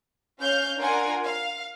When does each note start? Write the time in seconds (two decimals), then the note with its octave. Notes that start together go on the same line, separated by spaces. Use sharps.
0.39 C#4 F5 F6 G6
0.78 D4 F4 A#4 F#5 G#5
1.25 F5